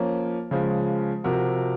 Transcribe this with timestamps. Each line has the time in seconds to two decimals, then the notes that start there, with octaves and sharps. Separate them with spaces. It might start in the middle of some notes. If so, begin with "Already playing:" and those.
Already playing: F3 A#3 C#4
0.51 C#3 F3 G#3
1.24 C3 F3 C4 F#4 A#4